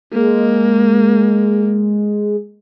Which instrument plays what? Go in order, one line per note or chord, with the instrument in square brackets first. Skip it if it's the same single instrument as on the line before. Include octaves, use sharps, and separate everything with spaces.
[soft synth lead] G#3 [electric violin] A#3